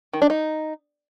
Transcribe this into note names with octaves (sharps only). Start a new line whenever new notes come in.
D#3
D4
D#4